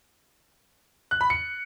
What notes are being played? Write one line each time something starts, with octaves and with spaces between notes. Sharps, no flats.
F#6
B5
C#7